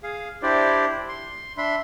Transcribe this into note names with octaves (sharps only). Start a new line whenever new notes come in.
G#4 F5
D4 E4 G4 C5 D5
C6
D4 E5 B5 C6